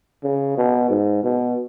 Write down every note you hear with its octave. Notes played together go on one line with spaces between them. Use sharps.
C#3
B2
G#2
B2